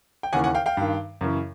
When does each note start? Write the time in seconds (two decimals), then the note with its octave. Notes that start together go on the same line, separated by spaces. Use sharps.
0.23 G5
0.33 D#2 C#3 E3 F#5 G#5
0.44 F#5 G#5
0.55 F5 G5
0.66 F5 G5
0.77 G2 D#3
1.21 F#2 C#3 E3